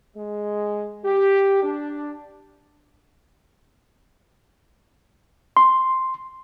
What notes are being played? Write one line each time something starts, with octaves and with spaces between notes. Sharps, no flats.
G#3
G4
D4
C6